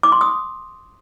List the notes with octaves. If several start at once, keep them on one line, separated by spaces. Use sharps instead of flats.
D6
C6
D#6